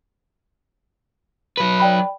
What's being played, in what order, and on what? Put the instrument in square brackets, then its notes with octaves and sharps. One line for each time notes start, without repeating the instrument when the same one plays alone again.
[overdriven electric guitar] F#3 B4
[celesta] D5 G5 B5